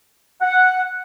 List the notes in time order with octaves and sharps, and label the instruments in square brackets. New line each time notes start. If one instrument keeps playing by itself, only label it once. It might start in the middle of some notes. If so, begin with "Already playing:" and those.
[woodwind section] F#5